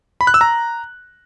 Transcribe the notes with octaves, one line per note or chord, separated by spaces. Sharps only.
B5
F#6
E6
A#5